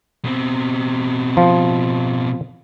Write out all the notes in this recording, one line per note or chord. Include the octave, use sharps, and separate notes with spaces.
B2 C4
F3